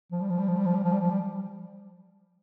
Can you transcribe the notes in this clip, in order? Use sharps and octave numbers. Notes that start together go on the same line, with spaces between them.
F3
G3
F3
G3
F3
G3
F3
G3
F3
G3
F3
G3